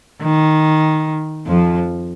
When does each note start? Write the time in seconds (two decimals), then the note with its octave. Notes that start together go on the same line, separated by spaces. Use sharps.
0.23 D#3
1.47 F2 F3